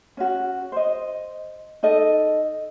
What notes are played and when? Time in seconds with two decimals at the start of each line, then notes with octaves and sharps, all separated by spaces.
0.17 C#4 F#4
0.72 C5 D#5
1.83 D#4 A4 D#5